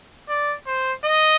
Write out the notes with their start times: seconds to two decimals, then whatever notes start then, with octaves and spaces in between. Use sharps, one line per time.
0.29 D5
0.66 C5
1.04 D#5